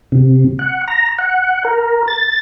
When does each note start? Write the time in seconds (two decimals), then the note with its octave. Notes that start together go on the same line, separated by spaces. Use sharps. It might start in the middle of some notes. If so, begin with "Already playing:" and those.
0.12 C3
0.59 F#5
0.88 A#5
1.19 F#5
1.65 A#4
2.08 A6